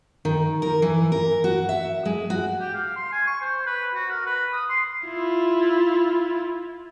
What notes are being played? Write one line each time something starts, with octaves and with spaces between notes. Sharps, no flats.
D#3
A#4
E3
A#4
F#4
E5
G#3
F#4
G4
F5
C6
G#5
C#6
C5
B4
F#4
A#4
B4
D#6
C6
E4 F4